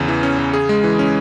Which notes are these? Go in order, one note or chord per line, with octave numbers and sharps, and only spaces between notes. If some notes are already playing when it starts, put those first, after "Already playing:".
Already playing: E2 C#3 C#4
E3
C#4
C#3
G#4
G#3
E3
C#4